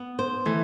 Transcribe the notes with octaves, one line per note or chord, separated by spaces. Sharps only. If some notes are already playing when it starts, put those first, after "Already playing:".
Already playing: B3
C5
E3 A3